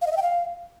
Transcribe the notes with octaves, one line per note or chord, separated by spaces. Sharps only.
F5
D#5
E5
G5
F5